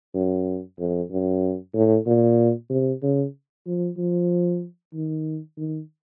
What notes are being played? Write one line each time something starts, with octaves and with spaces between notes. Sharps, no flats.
F#2
F2
F#2
A2
A#2
C3
C#3
F3
F3
D#3
D#3